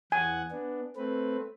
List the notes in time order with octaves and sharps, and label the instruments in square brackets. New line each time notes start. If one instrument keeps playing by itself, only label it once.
[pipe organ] E2 F#5 [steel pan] G#5
[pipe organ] B3 D4
A3 C4 B4